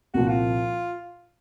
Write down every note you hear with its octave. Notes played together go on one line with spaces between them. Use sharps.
C2 A#2 F3 F#4
F4